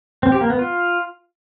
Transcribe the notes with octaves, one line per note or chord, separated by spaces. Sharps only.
C4
G4
A#3
B3
F4